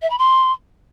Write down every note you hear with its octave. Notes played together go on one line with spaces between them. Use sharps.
E5
B5
C6